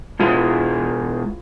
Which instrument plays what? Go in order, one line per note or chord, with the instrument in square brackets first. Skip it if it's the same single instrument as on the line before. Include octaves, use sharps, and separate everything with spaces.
[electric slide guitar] B2 G#3 G#4 [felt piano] E4 F4